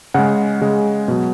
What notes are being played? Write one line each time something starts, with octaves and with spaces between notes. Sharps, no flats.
C#3 G#3 F#5
C#3 G#3
B2 F#3